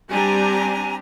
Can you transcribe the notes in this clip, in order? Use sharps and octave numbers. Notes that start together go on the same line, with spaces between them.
G3 C4 D4 G4 G#5 A#5